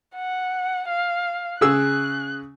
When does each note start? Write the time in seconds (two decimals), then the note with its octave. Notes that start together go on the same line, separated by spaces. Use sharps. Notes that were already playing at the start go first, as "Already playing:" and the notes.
0.15 F#5
0.89 F5
1.61 C#3 G#4 E6 F#6